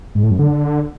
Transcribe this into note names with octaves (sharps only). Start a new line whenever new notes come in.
G#2
A2
F#2
D3